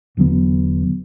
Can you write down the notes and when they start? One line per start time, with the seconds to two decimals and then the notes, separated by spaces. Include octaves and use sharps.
0.17 E1 D3 F#3 B3